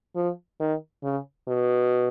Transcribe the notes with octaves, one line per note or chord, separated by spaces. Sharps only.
F3
D#3
C#3
B2